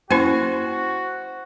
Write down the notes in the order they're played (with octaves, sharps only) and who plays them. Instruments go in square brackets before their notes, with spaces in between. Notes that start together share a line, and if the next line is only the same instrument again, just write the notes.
[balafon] A#3 C#4 E4 [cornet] F#4 [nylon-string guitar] C5